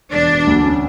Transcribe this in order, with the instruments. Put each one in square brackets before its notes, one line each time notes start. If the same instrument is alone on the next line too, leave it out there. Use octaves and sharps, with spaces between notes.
[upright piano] E1 [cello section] D4
[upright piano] E1
D2
C#4